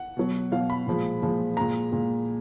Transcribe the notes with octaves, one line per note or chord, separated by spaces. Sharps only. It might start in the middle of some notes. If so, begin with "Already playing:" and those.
Already playing: F#5
B2 F#3
B2 F#3 F5
B5
A#2 F3 G#3
A#2 F3 G#3
A#2 G#3 A#5
A#2 G#3